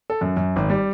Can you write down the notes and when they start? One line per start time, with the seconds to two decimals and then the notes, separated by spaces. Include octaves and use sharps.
0.10 A4
0.21 F#2
0.37 F#2
0.56 G#1
0.70 G3